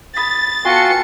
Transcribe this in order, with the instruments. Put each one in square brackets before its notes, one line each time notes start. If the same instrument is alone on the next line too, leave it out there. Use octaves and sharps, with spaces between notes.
[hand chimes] B5 D#6 B6 [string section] A6
[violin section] B3 A4 C#7 [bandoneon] F4 F#4 C6 [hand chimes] G5 G#5